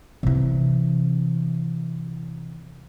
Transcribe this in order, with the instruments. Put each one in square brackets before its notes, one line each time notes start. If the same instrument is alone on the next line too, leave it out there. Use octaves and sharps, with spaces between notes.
[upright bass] C3 E3